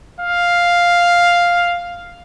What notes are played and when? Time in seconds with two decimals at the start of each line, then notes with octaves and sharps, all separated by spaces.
0.21 F5